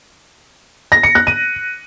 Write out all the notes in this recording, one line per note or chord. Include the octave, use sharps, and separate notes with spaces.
A#6
C#7
F#6
D#7